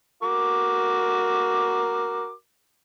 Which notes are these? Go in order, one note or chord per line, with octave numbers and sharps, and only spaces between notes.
F#4 A#4 D6